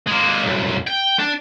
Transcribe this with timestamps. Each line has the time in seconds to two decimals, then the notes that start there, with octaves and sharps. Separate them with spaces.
0.07 G#3 A#3
0.43 C2 F#2
0.87 G5
1.19 D4